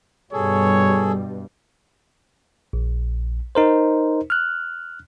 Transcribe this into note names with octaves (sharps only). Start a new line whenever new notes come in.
G2 B2 G3 G#4 A4 C#5
A#1
D#4 A#4 C5
F6 F#6